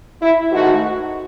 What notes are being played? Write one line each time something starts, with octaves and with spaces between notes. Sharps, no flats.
E4
G#2 D#3 A3 F#4